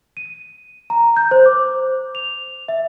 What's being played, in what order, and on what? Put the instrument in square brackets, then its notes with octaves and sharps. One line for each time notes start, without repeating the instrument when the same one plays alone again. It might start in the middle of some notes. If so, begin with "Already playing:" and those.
[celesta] D#7
A#5
G6
C5
D6
F7
E5